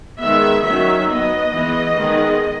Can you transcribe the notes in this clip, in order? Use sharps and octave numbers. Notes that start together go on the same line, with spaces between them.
D#3 G#3 B3 E5
D#3 F#3 C#4 E5
F#3 B3 D#5
E3 G#3 B3
D#3 G#3 B3